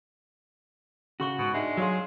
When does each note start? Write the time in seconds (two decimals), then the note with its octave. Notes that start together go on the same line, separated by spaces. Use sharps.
1.20 C#3 F#4 C#6 G7
1.38 G#2 B2
1.54 G#3 D4 D#4 E5
1.77 F#3 G#4 C#5 F5 C6